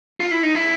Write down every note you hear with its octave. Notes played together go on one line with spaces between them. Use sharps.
F4
E4
D#4
E4